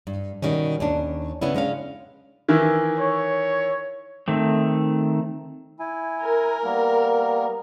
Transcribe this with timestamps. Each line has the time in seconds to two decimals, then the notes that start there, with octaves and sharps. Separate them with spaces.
0.07 G2
0.42 B2 D#3 G3 C#4
0.80 D#2 C#4 D4
1.41 C#3 B3 C#4 D4 E4
1.55 G#3 C#4 D4 F5
2.48 D#3 E3 E4
2.98 C#5
4.28 D#3 A3 C4
5.80 E4 G#5
6.21 A#4
6.64 G3 A#3 B3